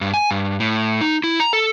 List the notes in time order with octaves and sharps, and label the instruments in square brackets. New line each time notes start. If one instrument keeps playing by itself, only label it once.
[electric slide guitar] G2
G#5
G2
A2
D#4
E4
A#5
A4